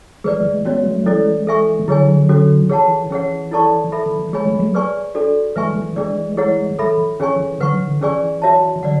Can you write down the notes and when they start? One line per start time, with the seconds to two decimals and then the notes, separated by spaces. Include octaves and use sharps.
0.24 E3 G#3 G#4 B4 D5
0.44 E3 G#3
0.65 G#3 B3 C#4 F#4 C#5
0.85 F#3 A3
1.06 E3 G#3 C#4 E4 A4 D5
1.47 A4 E5 G#5 C#6
1.88 D3 F#3 E4 G#4 C#5 G#5
2.29 C#4 F#4 A4
2.69 E3 G#4 C#5 F#5 A5
3.10 E3 C#4 G#4 C#5 F#5
3.51 E4 A4 D5 A5 C#6
3.92 A4 E5 B5
4.06 E3
4.20 E3
4.33 E3 G#3 G#4 C#5 G#5 B5
4.46 F#3 A3
4.54 G#3
4.60 F#3 A3
4.74 G#4 B4 D5 G#5 C#6
5.15 D4 F#4 A4 D5
5.56 E3 G#3 B4 E5 G#5 C#6
5.76 E3
5.96 E3 G#3 D4 G#4 D5
6.37 E4 G#4 C#5 F#5
6.79 E3 A4 E5 B5
7.20 E3 C#4 G#4 C#5 G#5 C#6
7.40 E3
7.60 D3 F#3 B4 F#5 C#6
7.74 E3
7.88 D3
8.01 E3 C#4 G#4 D5 G#5 C#6
8.42 F#4 C#5 E5 A5
8.83 D3 F#3 D5 F#5